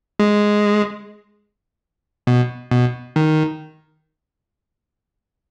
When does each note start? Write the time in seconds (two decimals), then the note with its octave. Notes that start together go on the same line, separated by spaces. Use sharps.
0.19 G#3
2.27 B2
2.71 B2
3.16 D#3